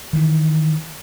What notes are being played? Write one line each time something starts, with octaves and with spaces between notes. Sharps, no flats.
D#3 E3